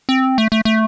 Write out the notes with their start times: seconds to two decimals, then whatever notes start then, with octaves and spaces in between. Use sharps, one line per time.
0.09 C4
0.38 A3
0.52 A3
0.65 A3